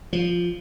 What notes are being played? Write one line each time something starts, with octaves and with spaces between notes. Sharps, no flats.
F3